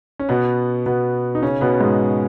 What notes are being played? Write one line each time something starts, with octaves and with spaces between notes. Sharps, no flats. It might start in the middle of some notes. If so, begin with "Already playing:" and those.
C#4
B2 B3
B2 B3
D#4
C#3 C#4
B2 B3
G#2 G#3